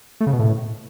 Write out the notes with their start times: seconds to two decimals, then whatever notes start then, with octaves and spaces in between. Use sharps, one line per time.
0.20 A3
0.27 C#3
0.33 B2
0.39 A2